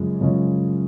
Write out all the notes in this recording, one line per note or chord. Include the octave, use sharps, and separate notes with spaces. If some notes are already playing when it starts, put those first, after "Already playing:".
Already playing: F#2 C#3 F3 G#3 C#4
F#2 C#3 F3 G#3 C#4